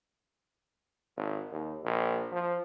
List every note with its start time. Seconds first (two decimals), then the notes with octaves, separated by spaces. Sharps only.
1.17 G#1
1.52 D#2
1.84 A#1
2.32 F3